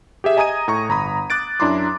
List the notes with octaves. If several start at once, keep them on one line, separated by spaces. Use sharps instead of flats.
G4 G#4 E5
D#5 G#5 A#5 D#6 G#6 D#7
A2 A#5 C#6
G1 A#5 B5 D#6
D6 F#6 A6 D7
F#2 D4 E4 A#5 C6 D6